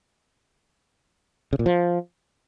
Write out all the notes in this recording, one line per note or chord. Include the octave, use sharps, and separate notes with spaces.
C#3
A#2
F3